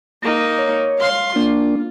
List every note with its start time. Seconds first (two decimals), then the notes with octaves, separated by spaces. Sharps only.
0.23 A#3 D#4
0.59 C#5
0.99 F5 C6
1.36 A#3 D4 F4